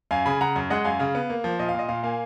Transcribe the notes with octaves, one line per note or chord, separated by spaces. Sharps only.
F#2 F5 G#5
C#3 G#5 B5
C#3 F#5 A#5
F#2
G#3 D#5 F#5
F#2 F5 G#5
C#3 F5
B3
A#3
F3
A#2 D#5
F5
A#2 D#5
A#2 F5
A#3 F5 G#5